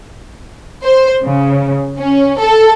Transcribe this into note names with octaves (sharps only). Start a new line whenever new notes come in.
C5
C#3
C#4
A4